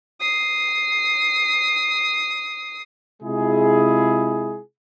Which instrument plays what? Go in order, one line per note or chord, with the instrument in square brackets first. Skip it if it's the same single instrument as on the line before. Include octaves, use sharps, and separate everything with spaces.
[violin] D#6 C7
[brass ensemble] C3 G#3 E4 F4 G#4